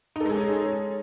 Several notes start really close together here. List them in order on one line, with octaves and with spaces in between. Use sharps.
D#4 A4 G#3 G#4 C#4